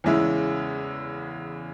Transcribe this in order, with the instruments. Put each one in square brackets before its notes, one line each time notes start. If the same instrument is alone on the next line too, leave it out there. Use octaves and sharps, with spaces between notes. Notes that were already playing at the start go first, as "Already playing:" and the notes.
[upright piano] E2 C#3 G#3 C#4 E4